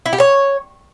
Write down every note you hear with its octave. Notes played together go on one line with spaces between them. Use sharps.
E4
G4
C#5